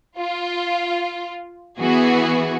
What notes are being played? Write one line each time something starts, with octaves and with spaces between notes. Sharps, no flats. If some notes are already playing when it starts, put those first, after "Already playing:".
F4
E3 B3 F#4 G#4